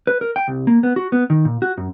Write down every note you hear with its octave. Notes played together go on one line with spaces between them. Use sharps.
B4
A#4
G5
C2
A#3
B3
F#4
B3
D#3
A#2
F#4
F#2